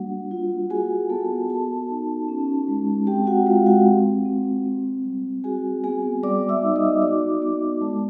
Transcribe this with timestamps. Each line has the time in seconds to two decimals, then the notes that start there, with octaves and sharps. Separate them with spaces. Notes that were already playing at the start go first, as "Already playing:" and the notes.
Already playing: G3 A#3 D4 F#4 F#5
0.31 F4
0.70 F#4 G#4 G#5
1.09 B3 A4 A5
1.49 F#4 A4 A5
1.89 D#4
2.29 C#4
2.68 G#3
3.07 C4 G4 G5
3.27 F#4 F#5
3.46 G#3 F4 F5
3.66 F#4 F#5
3.86 C4
4.25 C4
4.65 C4
5.04 G3
5.44 F#4 G#4 G#5
5.84 B3 G#4 G#5
6.23 G3 D5 D6
6.49 E5 E6
6.63 D#4
6.76 D#5 D#6
7.02 F#4 D5 D6
7.41 B3 D5 D6
7.81 G#3 A4 A5